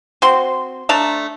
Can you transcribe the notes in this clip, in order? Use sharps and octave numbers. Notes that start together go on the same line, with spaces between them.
C4 F#4 C6
A3 D4 A5 A#5